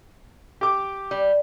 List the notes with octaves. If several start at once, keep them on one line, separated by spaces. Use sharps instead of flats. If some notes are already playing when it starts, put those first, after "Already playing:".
G4 D6
G3